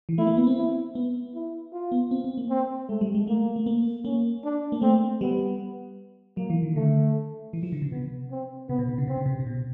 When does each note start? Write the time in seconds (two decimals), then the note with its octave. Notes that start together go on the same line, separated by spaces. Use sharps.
0.09 E3
0.18 A3 E4
0.27 A#3
0.37 B3
0.47 C4
0.57 E4
0.95 B3
1.35 E4
1.73 F4
1.92 B3
2.11 C4
2.24 C4
2.38 A#3
2.50 C4
2.89 G#3 A3
3.01 G3
3.15 G#3
3.27 A3 A#3
3.56 A3
3.66 A#3
4.05 A#3 C#4
4.44 D4
4.72 A#3
4.82 A3 C4
5.21 G3 B3
6.37 F#3 A#3
6.50 E3
6.63 D#3
6.75 D3 A3
7.53 E3
7.63 F3
7.72 D3
7.82 C#3
7.92 C3 B3
8.31 C4
8.69 C3 B3
8.79 B2
8.89 C3
8.98 C#3
9.08 C3 C4
9.17 C#3
9.26 C3
9.40 C3
9.47 B2